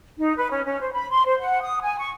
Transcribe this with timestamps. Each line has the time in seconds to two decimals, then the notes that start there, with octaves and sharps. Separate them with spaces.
0.17 D#4
0.37 B4
0.50 C#4
0.66 C#4
0.80 C5
0.93 B5
1.10 C6
1.25 C5
1.40 F#5
1.62 D#6
1.81 G#5
1.98 C#6